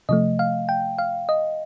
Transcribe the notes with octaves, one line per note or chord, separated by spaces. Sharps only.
C3 F3 A3 D#5
F5
G5
F5
D#5